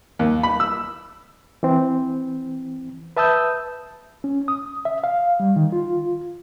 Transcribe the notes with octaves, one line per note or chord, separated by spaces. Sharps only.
D#2
B5
E6
E3 C4
B4 E5 A5 D#6 E6 G6
C#4
D#6
E5
F5
G3
D#3
F4